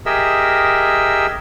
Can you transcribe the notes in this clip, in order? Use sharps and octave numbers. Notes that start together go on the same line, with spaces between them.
G4 G#4 A#4 D#5 E5 E6